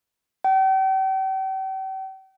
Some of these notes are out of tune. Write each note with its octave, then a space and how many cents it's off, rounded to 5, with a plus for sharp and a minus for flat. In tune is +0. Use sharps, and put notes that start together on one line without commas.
G5 -40